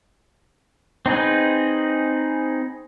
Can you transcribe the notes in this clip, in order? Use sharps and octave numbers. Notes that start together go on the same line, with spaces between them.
C4 D#4 G#4 B4